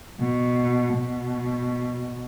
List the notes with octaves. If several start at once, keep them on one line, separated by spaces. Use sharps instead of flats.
B2
B2